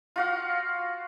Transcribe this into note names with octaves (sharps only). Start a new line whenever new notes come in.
F4 F#4 F5